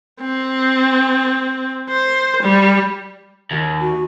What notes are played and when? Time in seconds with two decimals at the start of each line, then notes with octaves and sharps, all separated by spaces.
0.21 C4
1.89 C5
2.42 G3
3.51 D#2
3.81 F#4